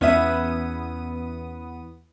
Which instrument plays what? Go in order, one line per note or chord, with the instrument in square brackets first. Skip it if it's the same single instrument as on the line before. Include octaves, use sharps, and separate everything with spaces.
[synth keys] E2 B3 D#6 [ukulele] C#4 E5